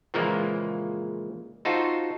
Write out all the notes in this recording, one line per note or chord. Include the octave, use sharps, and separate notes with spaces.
A#2 C#3 E3 F3 G#3 A#3
D#4 F4 F#4 A4 C5